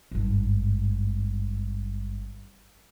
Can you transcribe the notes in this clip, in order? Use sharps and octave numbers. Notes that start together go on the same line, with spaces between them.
G#1 G2